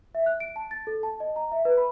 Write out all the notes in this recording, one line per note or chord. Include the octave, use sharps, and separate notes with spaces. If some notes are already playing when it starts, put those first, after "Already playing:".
E5
F#6
D7
A5
A6
A4
A5
D#5
A#5
E5
B4
B5